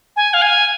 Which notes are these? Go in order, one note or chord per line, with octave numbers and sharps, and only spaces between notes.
G#5
F5
G#5